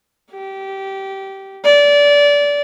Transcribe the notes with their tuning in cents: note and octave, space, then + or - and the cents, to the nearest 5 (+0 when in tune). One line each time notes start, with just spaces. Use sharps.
G4 -15
D5 -25